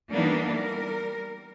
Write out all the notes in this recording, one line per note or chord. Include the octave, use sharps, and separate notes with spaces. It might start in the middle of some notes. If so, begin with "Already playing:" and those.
E3 G3 A#3 B3 D4 D#4
G3 A#4